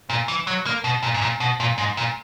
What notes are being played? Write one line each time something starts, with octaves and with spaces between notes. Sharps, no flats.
A#2
E3
F#3
A#3
B2
A#2
G#2
A#2
B2
A#2
G#2
A#2